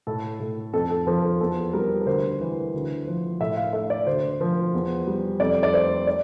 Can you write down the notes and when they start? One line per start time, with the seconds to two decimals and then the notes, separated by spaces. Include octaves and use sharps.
0.07 A2 A4
0.40 A2
0.73 F2 A4
0.90 A4
1.07 F3 A4
1.24 A4
1.41 E2 A4
1.73 G3 A#4
2.02 A#4
2.06 D2 C5
2.41 E3
2.74 D2
3.07 F3
3.40 A2 E5
3.57 F5
3.73 A3 E5
3.90 D5
4.06 D2 C5
4.41 F3
4.74 E2
5.07 G3
5.40 F2 D5
5.63 D5
5.73 A3 C5
6.07 D5